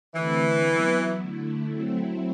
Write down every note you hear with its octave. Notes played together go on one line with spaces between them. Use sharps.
D3 E3 A3 C4
F#3 B3 E4
D3 A3 E4
F#3 A3 C4 E4